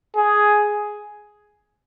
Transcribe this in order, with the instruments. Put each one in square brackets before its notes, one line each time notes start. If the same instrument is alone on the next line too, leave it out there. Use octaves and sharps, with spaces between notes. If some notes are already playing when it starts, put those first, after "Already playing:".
[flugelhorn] G#4